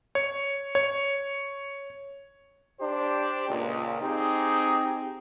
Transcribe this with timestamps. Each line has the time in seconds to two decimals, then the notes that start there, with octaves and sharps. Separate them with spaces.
0.15 C#5
0.75 C#5
2.80 D4 G4 C5
3.49 C#2 A#2
4.02 C4 D#4 G4 G#4